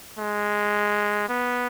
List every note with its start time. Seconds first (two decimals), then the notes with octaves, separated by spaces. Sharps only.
0.19 G#3
1.29 B3